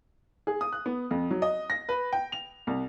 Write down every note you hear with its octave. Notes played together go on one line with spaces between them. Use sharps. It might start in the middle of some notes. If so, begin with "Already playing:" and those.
G#4
D#6
F#6
B3
F2
F#3
D#5
A#6
B4
G5
F7
C2